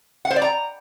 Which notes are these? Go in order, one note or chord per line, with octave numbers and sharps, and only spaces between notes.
F#5
C5
D5
A#5